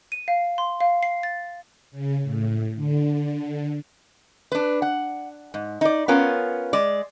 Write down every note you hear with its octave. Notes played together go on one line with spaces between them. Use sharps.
D#7
F5
C6
F5
C7
A6
C#3
A2
D3
D4 B4
F#5
G#2
D#4 D5
B3 C#4 F4 A#4
G#3 D5